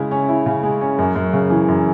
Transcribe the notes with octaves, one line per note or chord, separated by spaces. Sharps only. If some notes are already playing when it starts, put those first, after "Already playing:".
Already playing: C#3 G#3 E4
C#4
E4
C#3
G#3
C#4
F#2
F#2
C#3
E3
F#2